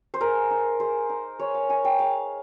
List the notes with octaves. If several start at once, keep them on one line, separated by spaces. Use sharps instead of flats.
C5
G#3 A#4
D#4
G#3 C5
D#4
G#3 C#5
F5
D#4 G#5
G5
G#3 F5